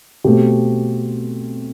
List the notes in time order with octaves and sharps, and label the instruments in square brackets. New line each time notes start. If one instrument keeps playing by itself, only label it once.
[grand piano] B2 A3 C4 G4